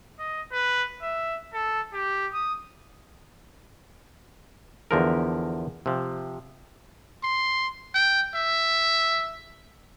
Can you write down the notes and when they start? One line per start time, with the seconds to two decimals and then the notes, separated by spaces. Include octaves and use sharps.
0.19 D#5
0.52 B4
1.02 E5
1.53 A4
1.93 G4
2.33 D#6
4.91 E2 D3 F3 A#4
5.86 C3 F3
7.24 C6
7.94 G5
8.35 E5